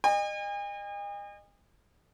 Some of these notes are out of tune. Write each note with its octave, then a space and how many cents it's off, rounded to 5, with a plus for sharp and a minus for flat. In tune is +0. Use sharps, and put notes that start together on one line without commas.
D#5 -30 G#5 -45